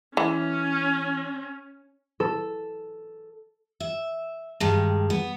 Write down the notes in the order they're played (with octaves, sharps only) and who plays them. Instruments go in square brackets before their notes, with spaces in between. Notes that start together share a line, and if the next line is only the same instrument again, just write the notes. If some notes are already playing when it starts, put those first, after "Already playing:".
[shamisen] E3 [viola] C#4
[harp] A4
[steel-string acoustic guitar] E5
G2 D#3 G#3
B3